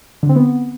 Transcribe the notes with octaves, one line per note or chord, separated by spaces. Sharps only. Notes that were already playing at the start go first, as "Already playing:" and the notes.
D3
C4
B3